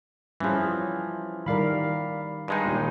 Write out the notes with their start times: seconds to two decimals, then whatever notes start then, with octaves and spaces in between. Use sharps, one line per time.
0.40 E3 F3 G3 C#4 G#4
1.46 D#3 G3 A#4 D5 F5 B5
2.48 G2 G#3 D#4
2.66 D#2 A#2